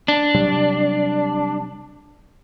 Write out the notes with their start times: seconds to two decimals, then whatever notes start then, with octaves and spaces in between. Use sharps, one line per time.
0.08 D4
0.35 C3 F#3 G3